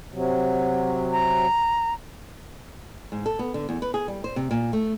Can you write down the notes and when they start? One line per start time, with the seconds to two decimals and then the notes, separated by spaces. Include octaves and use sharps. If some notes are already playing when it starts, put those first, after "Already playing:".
0.12 C3 F#3
1.12 A#5
3.12 G#2
3.26 A4
3.39 B3
3.54 D3
3.69 E2
3.82 B4
3.94 G#4
4.08 G3
4.24 C5
4.36 C3
4.51 A#2
4.73 A3